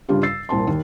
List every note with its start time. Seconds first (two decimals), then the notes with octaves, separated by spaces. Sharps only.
0.09 G2 C#3 G3 D4 F4 G4
0.23 E6 A6 C7
0.49 C2 A#2 C4 A5 C6
0.67 D#2